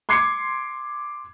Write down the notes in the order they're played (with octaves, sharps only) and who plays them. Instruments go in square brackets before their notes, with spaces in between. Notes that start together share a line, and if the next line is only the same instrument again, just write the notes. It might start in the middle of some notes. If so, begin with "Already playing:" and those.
[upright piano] C6 D6 G#6 C7 C#7